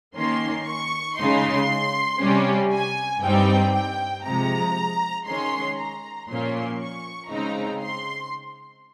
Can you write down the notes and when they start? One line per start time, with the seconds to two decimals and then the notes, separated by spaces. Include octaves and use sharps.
0.16 D#3 A#3 C#4 C6
0.66 C#6
1.17 C#3 G#3 D#4 C6
2.20 C3 G3 C#4
2.71 G#5
3.22 G2 G3 C4 D#4 G5
3.73 G5
4.25 C3 F3 G#3 A#5
5.26 D#3 G#3 C#4 C6
5.78 A#5
6.28 A#2 F3 A#3 C#4 C6
6.80 C#6
7.30 C#3 G#3 C4 D#4 A#5
7.81 C6